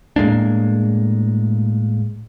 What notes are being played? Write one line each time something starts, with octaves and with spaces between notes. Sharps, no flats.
A2 G#3 A#3 D4